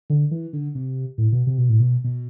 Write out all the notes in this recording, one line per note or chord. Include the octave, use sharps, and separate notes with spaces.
D3
E3
D3
C3
A2
B2
C3
B2
A2
B2
B2